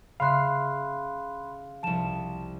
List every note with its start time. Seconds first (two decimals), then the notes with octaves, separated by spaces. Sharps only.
0.20 C#3 E5 F5 B5 C6 F#6 C7
1.83 C2 F3 A5 E7